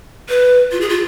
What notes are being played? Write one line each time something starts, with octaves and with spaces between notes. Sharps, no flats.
B4
F4
G#4
F4